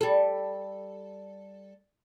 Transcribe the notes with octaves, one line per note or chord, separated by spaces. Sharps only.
G3 A4